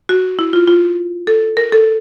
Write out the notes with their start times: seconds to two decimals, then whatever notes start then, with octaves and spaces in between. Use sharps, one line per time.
0.09 F#4
0.39 E4
0.53 F4
0.67 F4
1.27 A4
1.57 A#4
1.72 A4